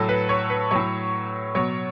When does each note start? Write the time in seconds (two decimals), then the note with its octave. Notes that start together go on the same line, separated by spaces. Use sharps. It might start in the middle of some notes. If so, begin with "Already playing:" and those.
Already playing: A2 F#3 A4
0.09 B4
0.29 C#5
0.50 B4
0.71 A2 F#3 C#5
1.55 B2 F#3 C#5